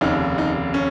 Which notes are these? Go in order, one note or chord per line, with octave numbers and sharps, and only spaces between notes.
F1 D#2 C#3 D#4
D#4
C#4